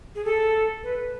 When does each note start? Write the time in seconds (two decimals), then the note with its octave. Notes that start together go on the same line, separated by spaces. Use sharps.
0.15 G#4
0.25 A4
0.84 B4